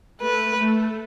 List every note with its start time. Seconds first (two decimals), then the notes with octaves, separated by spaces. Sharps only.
0.21 A3 B4
0.58 A3